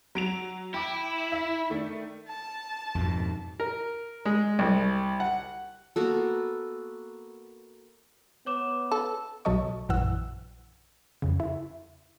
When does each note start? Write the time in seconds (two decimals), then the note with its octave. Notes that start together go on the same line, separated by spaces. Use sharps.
0.15 F#3 D7 F7
0.74 E4 G5 D6
1.32 E5
1.70 D#3 A3 D4
2.28 A5
2.95 F2 G#2 B2
3.60 A#4
4.25 G#3
4.59 C2
5.20 F#5
5.96 A#3 B3 F#4 A4
8.46 B3 C#5 D6 E7
8.91 A4
9.45 B1 B2 F#3 A4 D#5 C#6
9.89 A#1 F#2 E3 F#5 E6
11.22 F2 C#3
11.40 E4